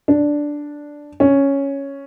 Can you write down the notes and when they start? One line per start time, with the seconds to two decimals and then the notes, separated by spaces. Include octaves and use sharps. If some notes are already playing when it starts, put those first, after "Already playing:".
0.08 D4
1.20 C#4